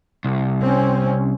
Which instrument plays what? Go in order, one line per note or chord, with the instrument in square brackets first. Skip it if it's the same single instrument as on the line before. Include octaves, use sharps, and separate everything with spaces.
[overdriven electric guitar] C2
[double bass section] C4 C#4